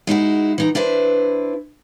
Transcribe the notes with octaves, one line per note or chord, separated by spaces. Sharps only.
G#3 D#4 E4 F#4
E3 D#4
D4 E4 B4 C5